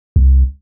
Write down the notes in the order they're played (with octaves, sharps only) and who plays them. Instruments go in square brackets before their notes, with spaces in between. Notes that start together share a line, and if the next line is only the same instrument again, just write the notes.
[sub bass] C2